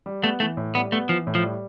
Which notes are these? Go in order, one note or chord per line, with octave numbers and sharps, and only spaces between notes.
G3
A3 B3
E3 A3
A2
G3 B3
A3 B3
E3 F3
A2
F3
G3